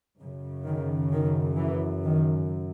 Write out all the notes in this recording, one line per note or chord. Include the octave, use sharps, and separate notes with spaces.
F#2 C#3
D#3
D#3
E3
D#3